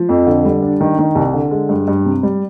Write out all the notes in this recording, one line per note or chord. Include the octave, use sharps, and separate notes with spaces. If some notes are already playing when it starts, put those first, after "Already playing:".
Already playing: F3
F2
D3
G3
D4
D#3
D#3
C2
D3
G#3
G2
G2
C3
G3